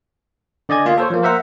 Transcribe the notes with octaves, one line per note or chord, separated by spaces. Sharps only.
D3 D5 D#5 G#5 G#6
A#3 F4 F5
A4 C5 C#5
F3 A#3
A#4 C5 E5 F#5 A#5